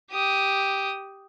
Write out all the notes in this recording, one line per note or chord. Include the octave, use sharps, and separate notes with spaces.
G4 D#6